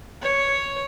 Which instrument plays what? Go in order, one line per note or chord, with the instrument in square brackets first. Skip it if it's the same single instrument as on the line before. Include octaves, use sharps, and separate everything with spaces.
[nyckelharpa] C#5